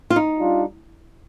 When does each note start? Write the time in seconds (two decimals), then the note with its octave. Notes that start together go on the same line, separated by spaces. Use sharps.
0.10 F4
0.16 D#4
0.39 G3 D4 F4